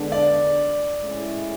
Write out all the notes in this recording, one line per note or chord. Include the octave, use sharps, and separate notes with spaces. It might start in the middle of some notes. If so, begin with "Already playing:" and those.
Already playing: D3 G#3 B3 D4
D5
A2 G#3 C#4 E4 G#4